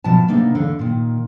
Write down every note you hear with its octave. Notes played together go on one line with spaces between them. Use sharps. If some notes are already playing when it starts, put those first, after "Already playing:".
B2 F3 B3 A5
C3 A#3 B3 D4 D#4
E2 D3 F5
A#2 D#3